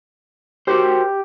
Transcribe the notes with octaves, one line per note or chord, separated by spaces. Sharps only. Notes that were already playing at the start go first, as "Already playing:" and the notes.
F#4 G4 A#4 C5